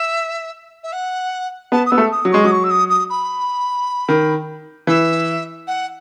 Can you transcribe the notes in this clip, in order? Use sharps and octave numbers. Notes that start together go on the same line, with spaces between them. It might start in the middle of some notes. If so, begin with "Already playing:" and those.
Already playing: E5
E5
F#5
B3 A5
D#6
B3 E6
A3
D#6
F#3
G#3 C#6
F#3 D#6
C#6
E6
D#6
D#6
B5
D#3
E3 E5
F#5